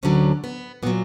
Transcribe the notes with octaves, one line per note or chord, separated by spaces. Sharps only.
D2 D3 F#3 C#4
B3
A#2 F#3 B3